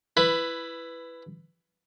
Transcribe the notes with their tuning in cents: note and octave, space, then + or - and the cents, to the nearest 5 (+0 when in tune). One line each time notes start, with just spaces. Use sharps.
E4 +15 B4 +5